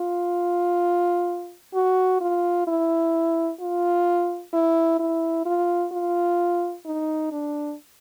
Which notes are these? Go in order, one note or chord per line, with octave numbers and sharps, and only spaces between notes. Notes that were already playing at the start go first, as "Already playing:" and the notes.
Already playing: F4
F#4
F4
E4
F4
E4
E4
F4
F4
D#4
D4